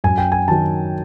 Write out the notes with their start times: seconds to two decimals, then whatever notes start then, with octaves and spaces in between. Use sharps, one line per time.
0.04 F#2 G#5
0.18 G5
0.32 G#5
0.48 D#3 F#3 A5